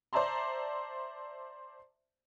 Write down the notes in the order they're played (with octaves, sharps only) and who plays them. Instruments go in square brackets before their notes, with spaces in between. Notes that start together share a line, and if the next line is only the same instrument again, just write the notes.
[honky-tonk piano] C5 D5 E5 A5 A#5 C6